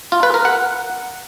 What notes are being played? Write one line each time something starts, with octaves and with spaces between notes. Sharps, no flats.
F4
B4
A#4
F#5